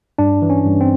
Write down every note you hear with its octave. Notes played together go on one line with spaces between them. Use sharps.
G2 D4
E3
C#4
G2
C4